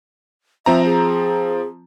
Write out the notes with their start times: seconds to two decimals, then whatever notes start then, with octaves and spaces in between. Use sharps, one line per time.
0.66 F3 C4 E5 A#5
0.85 G#4